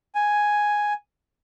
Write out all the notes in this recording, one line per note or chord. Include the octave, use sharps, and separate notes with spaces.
G#5